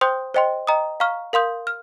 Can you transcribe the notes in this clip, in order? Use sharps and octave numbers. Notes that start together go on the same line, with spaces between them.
C5 G5 C6 D#6 G6
C5 D#5 G5 C6
D#5 G5 A#5 D#6
F5 A#5 C#6 F6
A#4 F5 C6 D#6 G6
F6